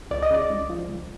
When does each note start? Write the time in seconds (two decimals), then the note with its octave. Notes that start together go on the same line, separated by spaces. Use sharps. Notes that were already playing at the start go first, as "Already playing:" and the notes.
0.11 C#2 D5
0.22 D#5
0.30 C#3 D5
0.50 C#2
0.70 F3
0.89 C#2